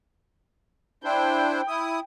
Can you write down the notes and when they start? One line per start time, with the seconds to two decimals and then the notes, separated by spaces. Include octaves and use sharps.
1.04 D4 E4 C5 G5
1.68 E4 D#6